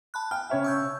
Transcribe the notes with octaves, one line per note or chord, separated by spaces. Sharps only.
A5 B5 F#6
G5 F6
C#3 C#5 E5
C#6 E6 G6